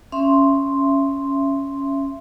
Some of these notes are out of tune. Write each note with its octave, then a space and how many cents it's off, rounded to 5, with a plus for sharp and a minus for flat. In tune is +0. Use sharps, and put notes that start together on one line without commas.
C#4 +0 E5 +25 C6 +0